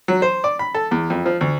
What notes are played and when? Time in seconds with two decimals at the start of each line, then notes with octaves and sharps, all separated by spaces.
0.08 F#3
0.22 C5
0.44 D5
0.59 B5
0.74 A4
0.91 E2
1.10 F2
1.26 F3
1.41 D2